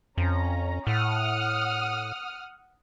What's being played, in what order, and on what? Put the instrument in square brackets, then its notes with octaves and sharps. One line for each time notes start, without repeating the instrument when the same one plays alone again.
[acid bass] F2 [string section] C#4 A#5
[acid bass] A2 [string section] F#5 D#6 F6